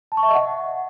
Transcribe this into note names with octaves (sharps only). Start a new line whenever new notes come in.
A5
C#6
E5
D#5
F#5